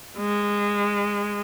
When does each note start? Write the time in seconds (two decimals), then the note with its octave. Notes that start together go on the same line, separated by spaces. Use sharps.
0.18 G#3